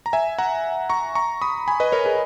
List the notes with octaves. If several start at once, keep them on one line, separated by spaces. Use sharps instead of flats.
A#5
E5 G#5
F#5 A#5
A#5 C#6
A#5 C#6
B5 D#6
G#5 B5
B4 D#5
A#4 C#5
G#4 B4